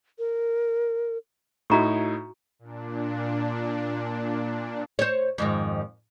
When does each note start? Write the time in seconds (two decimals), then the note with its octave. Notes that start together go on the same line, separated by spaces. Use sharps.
0.19 A#4
1.70 A2 D#4 E4 F#4 A#5 C#6
2.59 A#2 D4
4.99 C5 C#5
5.38 F2 G#2 D#3